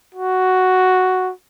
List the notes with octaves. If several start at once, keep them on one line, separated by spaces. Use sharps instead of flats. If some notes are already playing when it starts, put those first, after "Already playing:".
F#4